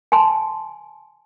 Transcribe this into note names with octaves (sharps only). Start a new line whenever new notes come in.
G#5 A5 C6